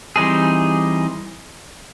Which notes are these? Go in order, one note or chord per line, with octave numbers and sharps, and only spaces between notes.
E3 G3 C4 D#4 G#4